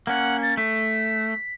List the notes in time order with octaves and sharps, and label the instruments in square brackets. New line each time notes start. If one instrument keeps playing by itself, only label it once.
[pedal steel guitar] A#3 C#4 [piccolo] F#5
[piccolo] A6
[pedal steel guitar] A3 [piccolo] B6